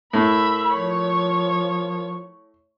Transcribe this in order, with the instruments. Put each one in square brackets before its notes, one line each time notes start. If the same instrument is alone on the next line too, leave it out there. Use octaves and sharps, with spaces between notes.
[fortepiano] A2 [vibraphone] A#4 [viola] E5 B5
[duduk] F3 [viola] C#5